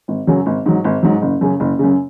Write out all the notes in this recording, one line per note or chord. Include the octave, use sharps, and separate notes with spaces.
G#1
F#2 C#3 F#3
G#1
G#2 F#3
G#1
G#2 F#3
F#1
F#2 C#3
F#1
F#2 C#3